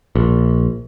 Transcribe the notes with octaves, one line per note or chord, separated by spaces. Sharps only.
A#1